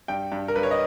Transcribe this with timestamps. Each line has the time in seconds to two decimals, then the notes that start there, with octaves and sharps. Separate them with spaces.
0.08 G2 G5
0.32 G2
0.48 A#4
0.55 G2 B4
0.63 C#5
0.71 D#5